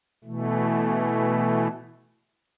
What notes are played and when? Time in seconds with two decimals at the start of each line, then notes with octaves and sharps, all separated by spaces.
0.24 B2 E3 A3